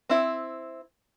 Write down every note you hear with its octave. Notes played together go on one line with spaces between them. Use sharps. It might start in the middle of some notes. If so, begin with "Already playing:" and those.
C4 E4